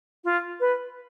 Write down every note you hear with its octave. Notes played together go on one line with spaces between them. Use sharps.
F4
B4